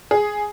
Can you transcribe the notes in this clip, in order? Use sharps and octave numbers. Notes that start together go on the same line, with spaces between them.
G#4